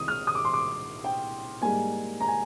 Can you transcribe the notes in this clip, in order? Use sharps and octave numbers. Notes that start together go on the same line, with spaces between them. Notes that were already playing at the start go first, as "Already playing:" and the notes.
Already playing: C2 C3 D#3 D#6
F6
D#6
D6
C6
D6
G5
G#2 G3 A#3 G#5
A#5
G#5